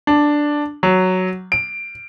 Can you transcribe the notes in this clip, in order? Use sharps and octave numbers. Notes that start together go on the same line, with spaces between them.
D4
F#3
D7